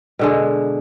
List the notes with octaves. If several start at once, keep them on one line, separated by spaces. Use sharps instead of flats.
B2 D3 G#3